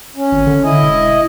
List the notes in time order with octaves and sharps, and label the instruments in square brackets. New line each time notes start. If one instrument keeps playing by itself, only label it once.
[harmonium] C#4
[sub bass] G#1
D3
[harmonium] E4 D#5
[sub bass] E1